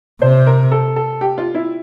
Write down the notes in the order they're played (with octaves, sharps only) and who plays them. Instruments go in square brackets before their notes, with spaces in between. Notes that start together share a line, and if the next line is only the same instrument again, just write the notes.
[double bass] C3 [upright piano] C5
[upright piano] A#4
A4
A4
G4
F4
E4